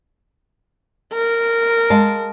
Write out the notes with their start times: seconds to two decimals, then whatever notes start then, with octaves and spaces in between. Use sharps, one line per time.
1.14 A#4
1.90 G#3 F5 A5